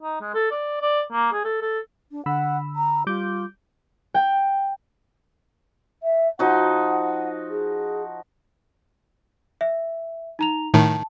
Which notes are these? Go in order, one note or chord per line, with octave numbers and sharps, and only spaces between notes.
D#4
G#3
A4
D5
D5
A#3
G#4
A4
A4
D4
D3 F#5 B5 E6
A#5
G3 F4 D6 G6
G5
E5
F3 D#4 F#4 F#5
G#4
E5
D#4 A#5 F7
A2 D#3 A5